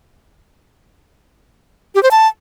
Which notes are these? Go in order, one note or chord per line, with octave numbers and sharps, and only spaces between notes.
G4
C5
A5